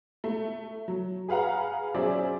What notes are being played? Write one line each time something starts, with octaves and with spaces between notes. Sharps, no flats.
A3
F#3
G#4 B4 F5 F#5 A#5
F#3 C#4 G#4 C5 D5 E5